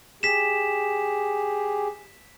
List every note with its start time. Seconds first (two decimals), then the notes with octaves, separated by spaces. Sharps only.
0.23 G4 G#4 B6 E7